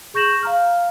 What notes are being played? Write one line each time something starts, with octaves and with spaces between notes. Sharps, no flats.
G#4 C#6 G6 A#6 E7 F#7
F5 A#5 F6